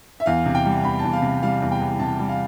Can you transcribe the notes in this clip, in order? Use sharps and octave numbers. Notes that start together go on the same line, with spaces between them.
E5
E2 F5
C3
G5
G3
E2 B5
E2 A5
F5
C3
G3 F5
E2
G5
E2
C3 A5
G3
F5